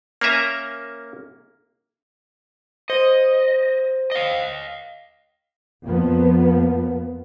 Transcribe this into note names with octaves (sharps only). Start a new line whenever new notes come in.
A#3 C#4 A#4 E5 G#5 A#5
C5 D#5
D#5 F5
F2 F3 A#3 B3